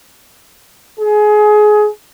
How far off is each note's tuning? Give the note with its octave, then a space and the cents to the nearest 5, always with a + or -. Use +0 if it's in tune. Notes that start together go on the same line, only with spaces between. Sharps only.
G#4 +25